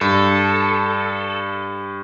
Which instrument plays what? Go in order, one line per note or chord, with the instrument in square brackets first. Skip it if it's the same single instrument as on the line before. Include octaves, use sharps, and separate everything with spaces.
[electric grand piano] G2 [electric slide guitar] A4